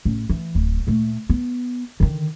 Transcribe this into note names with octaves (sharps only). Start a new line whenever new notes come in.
A1
E3
D1
A#2 A3
B3
D3 D#3